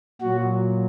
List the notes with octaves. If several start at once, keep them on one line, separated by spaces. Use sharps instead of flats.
A#2 F#3 F#4